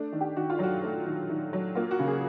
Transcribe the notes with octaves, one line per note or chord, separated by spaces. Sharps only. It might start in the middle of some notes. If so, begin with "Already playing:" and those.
Already playing: A3 D4
D#3
G4
D#3 F#4
F4
F#3 F#4
A3
D#3
D#3
F#3
A#3 F4
F#4
C#3
G#4